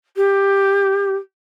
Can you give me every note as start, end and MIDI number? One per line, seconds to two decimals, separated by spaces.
0.16 1.15 67